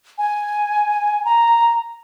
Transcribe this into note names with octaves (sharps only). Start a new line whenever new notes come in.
G#5
A#5